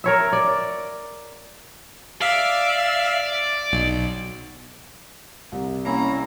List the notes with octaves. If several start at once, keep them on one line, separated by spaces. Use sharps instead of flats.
A#4 C#5 E5
D5
D5 E5 F5
B1
C2
A#3 C#4 E4 A#5